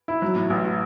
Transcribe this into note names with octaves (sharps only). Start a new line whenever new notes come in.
E4
F#3
A2
A1